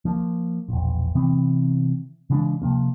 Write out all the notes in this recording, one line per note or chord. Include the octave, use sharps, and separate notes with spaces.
F3 A#3
E1 A#1
C3 E3 B3 C4
C#3 E3 G#3 D4
C3 F3 A#3